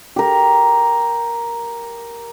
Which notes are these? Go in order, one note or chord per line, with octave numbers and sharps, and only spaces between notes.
G4 A#4